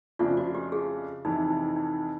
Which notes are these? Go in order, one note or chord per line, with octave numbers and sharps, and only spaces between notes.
F2 C#3 F3 A3 D4 F4
F#4
G4
G#4
F2 C3 E3 D#4
D#4
D#4